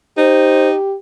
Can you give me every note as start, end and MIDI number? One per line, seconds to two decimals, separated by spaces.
0.18 0.76 63
0.18 0.95 67
0.18 0.69 72